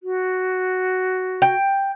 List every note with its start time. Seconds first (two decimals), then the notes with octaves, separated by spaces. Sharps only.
0.03 F#4
1.42 G5